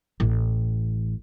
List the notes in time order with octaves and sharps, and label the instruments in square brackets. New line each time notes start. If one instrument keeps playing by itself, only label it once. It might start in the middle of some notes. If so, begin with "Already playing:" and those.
[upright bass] A1